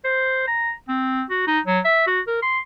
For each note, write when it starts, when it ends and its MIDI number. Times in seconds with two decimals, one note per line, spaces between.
0.05 0.47 72
0.47 0.72 82
0.89 1.23 60
1.30 1.44 66
1.47 1.60 63
1.66 1.80 54
1.85 2.05 76
2.07 2.20 66
2.27 2.41 70
2.43 2.59 84